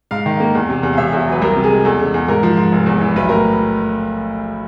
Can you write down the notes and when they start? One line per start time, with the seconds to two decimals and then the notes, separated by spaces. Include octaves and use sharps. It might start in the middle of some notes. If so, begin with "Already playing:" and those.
0.11 G#2 F5
0.26 D#3
0.40 A#3
0.55 E2
0.69 C3
0.83 E2
0.93 F5
0.97 E1 E5
1.13 E2
1.28 F#3 B4
1.42 C2 A#4
1.56 C3
1.64 G#4
1.70 G#3
1.85 E2 A4
1.99 C#3
2.14 E2
2.28 G#2 A#4
2.43 F3
2.57 G#2
2.72 F1
2.86 E2
3.01 E3
3.16 B1 B4
3.29 A2 A#4